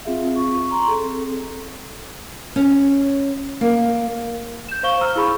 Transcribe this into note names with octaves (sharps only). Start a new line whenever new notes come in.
C4 F4 G#4 E5 F5
C#6
A#5 C6 C#6
C4 G#4 A4
C#4
A#3
G6 E7
C5 F5 C#6 G7
A#5 E6 F6
E4 G#4 B5 C#6